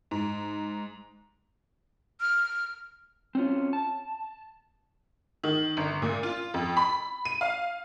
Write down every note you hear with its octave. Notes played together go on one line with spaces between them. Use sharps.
G#2
F6
C4 C#4 F4
A5
D#3
G1
A#2
F4
F2
B5
D#7
F5